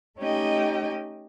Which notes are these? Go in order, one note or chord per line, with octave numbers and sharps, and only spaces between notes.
A3 C#4 D#4 G4 D#5 G5